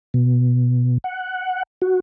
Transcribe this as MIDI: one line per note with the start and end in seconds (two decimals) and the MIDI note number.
0.14 0.98 47
1.04 1.63 78
1.82 2.00 66